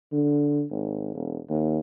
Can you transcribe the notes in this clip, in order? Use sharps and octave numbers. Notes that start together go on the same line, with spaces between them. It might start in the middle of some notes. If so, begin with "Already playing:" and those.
D3
G#1
E1
D#2